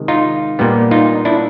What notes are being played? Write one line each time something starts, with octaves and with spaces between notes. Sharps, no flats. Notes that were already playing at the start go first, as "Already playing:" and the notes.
Already playing: C3 D#3 G#3
D#4 F4
A#2 G3 B3
D#4 F4
D4 E4